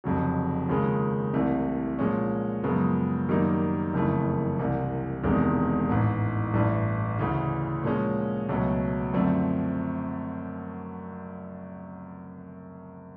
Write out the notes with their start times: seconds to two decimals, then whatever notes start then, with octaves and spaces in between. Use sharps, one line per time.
0.04 F1 F2 C#3 F#3
0.69 D#2 C#3 F3 G#3
1.34 C2 C3 E3 A3
1.99 A#2 F3 G#3 C#4
2.64 F#2 C#3 F3 G#3 B3
3.29 F#2 D#3 G3 A#3 D#4
3.93 F#1 F2 C#3 E3 A3
4.59 C2 C3 E3
5.23 E1 E2 C3 D#3 G#3
5.88 A1 G#2 E3
6.53 A1 G2 E3 A3
7.19 D2 C#3 E3
7.84 A#2 F3 G#3 C#4
8.49 C#2 B2 F#3 A3 C#4
9.13 F#2 D3 F3 A3 C4